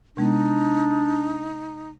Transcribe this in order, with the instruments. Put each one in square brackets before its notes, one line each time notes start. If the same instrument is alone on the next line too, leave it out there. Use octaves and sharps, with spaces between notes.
[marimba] C3 G#3 B3 [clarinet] D4 [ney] D#4